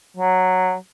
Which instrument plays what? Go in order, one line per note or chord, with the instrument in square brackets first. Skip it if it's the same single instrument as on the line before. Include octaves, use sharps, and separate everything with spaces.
[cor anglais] F#3